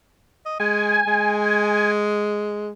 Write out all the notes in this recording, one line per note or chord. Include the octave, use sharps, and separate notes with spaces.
D#5
G#3 G#5
G#3